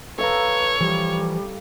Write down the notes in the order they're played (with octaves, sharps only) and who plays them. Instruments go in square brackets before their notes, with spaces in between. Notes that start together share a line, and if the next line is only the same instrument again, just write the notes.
[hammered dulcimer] A4 F5 A#5 [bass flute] B4 [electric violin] C#5
[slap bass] E3 F3 [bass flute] G3